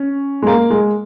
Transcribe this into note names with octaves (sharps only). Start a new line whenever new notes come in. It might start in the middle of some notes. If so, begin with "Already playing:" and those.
Already playing: C#4
G#3
A#3
G#3